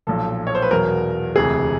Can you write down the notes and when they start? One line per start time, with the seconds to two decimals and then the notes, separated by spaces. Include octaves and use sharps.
0.07 B1 A#2 F3 A4
0.47 C#5
0.55 C5
0.62 B4
0.71 E2 B2 F#3 A#4
1.35 E1 D2 C3 E3 G#4